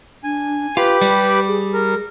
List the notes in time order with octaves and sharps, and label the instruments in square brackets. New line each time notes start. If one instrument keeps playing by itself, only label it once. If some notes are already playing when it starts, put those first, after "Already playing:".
[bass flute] D4 [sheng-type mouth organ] G#5
[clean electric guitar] F4 [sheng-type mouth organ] G4 B5 D6 [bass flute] B4
[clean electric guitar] G3
[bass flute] G#4
[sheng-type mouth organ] A#4